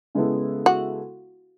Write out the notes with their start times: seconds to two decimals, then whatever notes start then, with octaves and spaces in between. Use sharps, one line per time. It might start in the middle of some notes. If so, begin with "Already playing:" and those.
0.15 C#3 G#3 B3 E4 A4
0.66 F#4